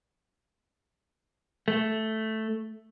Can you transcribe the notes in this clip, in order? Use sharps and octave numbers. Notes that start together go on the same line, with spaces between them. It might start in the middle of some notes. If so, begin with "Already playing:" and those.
A3